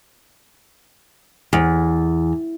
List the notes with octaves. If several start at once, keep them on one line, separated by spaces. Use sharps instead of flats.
E2